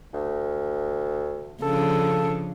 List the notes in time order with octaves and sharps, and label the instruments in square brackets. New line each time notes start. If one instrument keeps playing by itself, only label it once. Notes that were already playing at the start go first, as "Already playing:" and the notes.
[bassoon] D2
[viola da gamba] C#3 F3 D4 [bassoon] A4